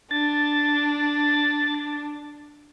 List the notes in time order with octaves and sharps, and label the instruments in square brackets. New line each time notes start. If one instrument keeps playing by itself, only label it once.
[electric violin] D4 [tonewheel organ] A6